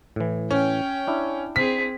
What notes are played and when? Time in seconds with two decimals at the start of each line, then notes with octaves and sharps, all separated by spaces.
0.16 A2 E3
0.51 C#4 G5
1.08 D4 E4
1.56 C4 G#4 B6